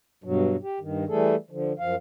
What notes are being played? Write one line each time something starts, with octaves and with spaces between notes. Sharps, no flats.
G2 B2 F#3
G4
G2 D#3
E3 G3 A3 G#4 A4
D3 F3
F#2 F3 F5